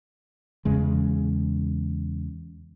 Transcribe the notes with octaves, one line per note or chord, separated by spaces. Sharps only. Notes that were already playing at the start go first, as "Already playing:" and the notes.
E2 C#3 G#3